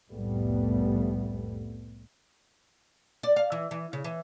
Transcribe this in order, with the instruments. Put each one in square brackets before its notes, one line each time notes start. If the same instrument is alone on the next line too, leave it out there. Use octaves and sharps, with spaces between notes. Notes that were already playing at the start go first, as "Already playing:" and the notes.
[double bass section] C2 F2 A2 G3 A3 B3
[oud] D5
F5
E3
E3
C#3
E3